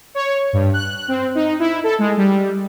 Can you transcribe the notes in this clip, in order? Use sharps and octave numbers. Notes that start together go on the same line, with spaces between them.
C#5
G2
F#6
C4
D#4
E4
A4
G#3
G3